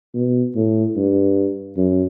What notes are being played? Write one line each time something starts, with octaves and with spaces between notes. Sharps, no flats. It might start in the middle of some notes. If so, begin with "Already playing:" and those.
B2
A2
G2
F#2